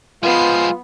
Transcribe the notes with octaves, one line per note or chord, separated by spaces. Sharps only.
F3 G#3 B3 F4 C7